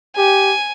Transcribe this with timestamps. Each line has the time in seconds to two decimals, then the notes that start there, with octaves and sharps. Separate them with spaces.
0.17 G4 G#5